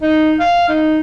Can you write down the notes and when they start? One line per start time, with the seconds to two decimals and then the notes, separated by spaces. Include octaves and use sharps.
0.02 D#4
0.40 F5
0.69 D#4